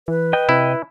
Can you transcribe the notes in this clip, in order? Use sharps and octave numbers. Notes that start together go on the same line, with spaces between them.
E3 B4
D#5 G5
C3 E4